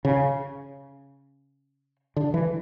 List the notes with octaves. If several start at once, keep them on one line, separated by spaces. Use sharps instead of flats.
C#3
D3
E3